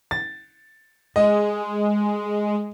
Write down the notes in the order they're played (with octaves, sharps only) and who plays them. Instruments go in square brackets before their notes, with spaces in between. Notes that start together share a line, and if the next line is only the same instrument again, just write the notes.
[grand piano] A6
[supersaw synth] G#3 [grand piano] D#5